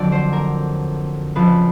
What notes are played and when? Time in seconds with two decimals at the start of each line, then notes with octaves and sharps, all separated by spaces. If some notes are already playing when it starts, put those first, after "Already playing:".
Already playing: F2 D3 F#3 D5
0.12 C5
0.33 A#4
1.35 F2 C#3 F3 B4